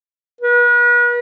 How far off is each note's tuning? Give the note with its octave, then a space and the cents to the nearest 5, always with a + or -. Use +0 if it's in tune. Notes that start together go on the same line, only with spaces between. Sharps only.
B4 -40